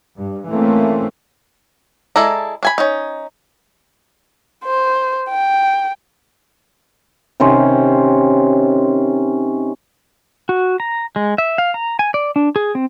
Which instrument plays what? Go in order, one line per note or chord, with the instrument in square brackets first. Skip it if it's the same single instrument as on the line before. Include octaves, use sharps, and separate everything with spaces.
[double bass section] G2
E3 A3 A#3 C4 C#4
[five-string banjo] G#3 E4 A4 D5 A#5
D4 G#5 B5
C#4 D#4
[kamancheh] C5
G5
[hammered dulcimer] C3 D#3 C#4 C5
[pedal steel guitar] F#4
A#5
G#3
E5
F5
A#5
G#5
D5
D4
G#4
C4